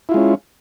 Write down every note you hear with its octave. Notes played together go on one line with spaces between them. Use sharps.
G#3 C#4 E4 F4